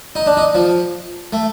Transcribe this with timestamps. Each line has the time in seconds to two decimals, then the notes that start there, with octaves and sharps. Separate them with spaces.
0.15 D#4
0.26 D4
0.37 D#4
0.54 F3
1.33 A3